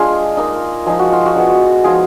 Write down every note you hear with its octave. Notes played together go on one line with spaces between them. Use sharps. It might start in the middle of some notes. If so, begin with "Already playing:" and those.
Already playing: G#3 D4 F4 G#4
A#3 D#4
F3 G#3 D#4 G#4
F#4
F4
F#4
G#3 B3 D4
F3 G#3 D#4 F4 G#4